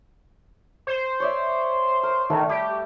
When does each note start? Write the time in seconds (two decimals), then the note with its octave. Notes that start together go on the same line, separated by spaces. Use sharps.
0.87 C5
1.20 C#5 D5 E5
2.03 A#4
2.30 D#3 A3
2.49 G3 G4